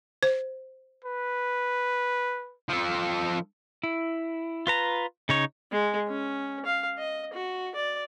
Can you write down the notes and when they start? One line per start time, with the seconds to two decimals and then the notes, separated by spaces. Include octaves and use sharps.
0.23 C5
1.04 B4
2.69 F3 A4
3.83 E4
4.67 F4 B4 A#5
5.29 C#3 D#4 C#5
5.72 G#3
6.08 C#4
6.65 F5
6.98 D#5
7.33 F#4
7.75 D5